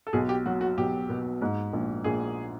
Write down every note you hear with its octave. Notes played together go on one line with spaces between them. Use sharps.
A4
B1 G#4
G4
F#3 F#4
F#4
B1 G4
B2
G#2
A#1
A#1 G#4